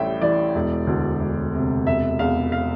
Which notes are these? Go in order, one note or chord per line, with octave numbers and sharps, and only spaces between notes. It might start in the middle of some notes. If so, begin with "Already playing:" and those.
Already playing: A1 A2 G3 E5 G5
E3 D5
E1
D2
E1
C3
E1 E5
E2 F5
F5